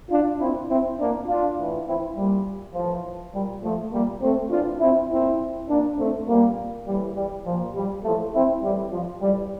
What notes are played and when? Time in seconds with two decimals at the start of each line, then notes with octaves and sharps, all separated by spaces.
0.09 D4 F4
0.39 A#2 C4 E4
0.68 C4 E4
0.98 A#2 A#3 D4
1.27 D4 F4
1.57 A2 E3
1.86 C4 E4
2.16 A#2 G3
2.74 A2 E3 F3
3.33 A#2 G3
3.63 F3 A3
3.92 A#2 G3 A#3
4.21 A3 C4
4.50 A2 E3 D4 F4
4.80 C4 E4
5.09 A#2 C4 E4
5.68 A#2 A#3 D4
5.98 A3 C4
6.27 A#2 G3 A#3
6.87 A2 E3 G3
7.15 G3
7.45 A#2 F3
7.75 G3
8.04 A2 E3 F3 A3
8.33 C4 E4
8.63 A2 E3 G3
8.91 F3
9.21 A2 E3 G3